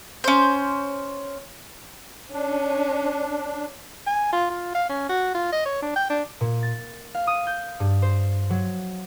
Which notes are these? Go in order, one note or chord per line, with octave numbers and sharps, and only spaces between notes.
C#4 C5
C#4 D4
G#5
F4
F4
F5
C#4
F#4
F4
D#5
C#5
D4
G5
D4
A#2
A6
F5
D#6
G6
G2
C5
F#3